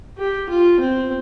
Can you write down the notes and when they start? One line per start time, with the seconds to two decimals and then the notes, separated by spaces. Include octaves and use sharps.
0.18 G4
0.49 F4
0.80 C4